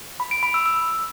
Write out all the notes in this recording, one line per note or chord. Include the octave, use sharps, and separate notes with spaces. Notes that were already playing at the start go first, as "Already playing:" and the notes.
B5
D7
B5
E6
E6